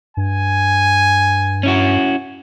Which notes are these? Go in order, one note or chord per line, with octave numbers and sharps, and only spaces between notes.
G2 G#5
C#4 E4 F#4